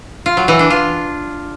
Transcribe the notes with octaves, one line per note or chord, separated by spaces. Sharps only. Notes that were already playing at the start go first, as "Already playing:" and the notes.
F4
F#3
E3
D4
F4